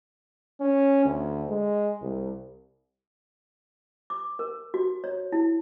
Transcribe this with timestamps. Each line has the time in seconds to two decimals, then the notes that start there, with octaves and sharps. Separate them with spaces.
0.60 C#4
1.05 D2
1.49 G#3
2.02 C2
4.10 D6
4.39 A#4
4.74 F#4
5.04 C#5
5.32 E4